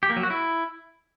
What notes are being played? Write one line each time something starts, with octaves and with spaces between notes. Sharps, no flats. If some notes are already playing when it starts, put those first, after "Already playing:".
G4
A#3
F#3
F#4
E4